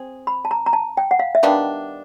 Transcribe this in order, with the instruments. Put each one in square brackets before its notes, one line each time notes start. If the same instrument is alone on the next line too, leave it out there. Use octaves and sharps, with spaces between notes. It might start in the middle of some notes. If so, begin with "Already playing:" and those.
Already playing: [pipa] C4 G#4
[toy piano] B5
A5
A#5
A#5
A5
G5
F#5
F5
E5
[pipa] D#3 G3 B3 D4 [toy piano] F5